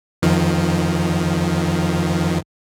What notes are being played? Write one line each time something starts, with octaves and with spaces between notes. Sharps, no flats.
F2 D#3 F3